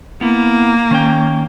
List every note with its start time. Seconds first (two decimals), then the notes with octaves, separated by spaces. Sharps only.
0.21 A#3 B3 E4
0.91 D#3 C#4 G5